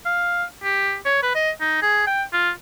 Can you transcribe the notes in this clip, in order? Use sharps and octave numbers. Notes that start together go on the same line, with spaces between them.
F5
G4
C#5
B4
D#5
D#4
G#4
G5
F4